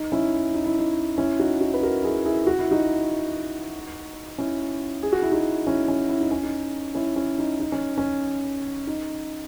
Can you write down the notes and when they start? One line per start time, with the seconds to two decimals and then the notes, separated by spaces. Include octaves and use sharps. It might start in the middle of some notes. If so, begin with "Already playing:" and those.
Already playing: D#4
0.12 C#4 E4
0.54 D#4
0.66 E4
0.79 D#4
1.18 C#4 E4
1.40 D#4 F#4
1.61 D#4 F#4
1.74 B4
1.83 F#4 A#4
2.03 E4 G#4
2.25 E4 G#4
2.47 F#4
2.59 E4
2.71 D#4 F#4
4.38 C#4 E4
5.03 G#4
5.12 F#4
5.22 E4
5.31 D#4 F#4
5.67 C#4 E4
5.88 C#4
6.09 E4
6.21 D#4
6.31 C#4
6.43 D#4
6.95 C#4 E4
7.16 C#4
7.38 D#4
7.60 D#4
7.72 C#4
7.98 C#4
8.87 D#4